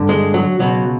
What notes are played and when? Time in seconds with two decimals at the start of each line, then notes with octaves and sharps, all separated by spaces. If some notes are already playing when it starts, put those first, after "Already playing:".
Already playing: G2 D3
0.09 G#3
0.34 F#3
0.59 C#2 B2 F#3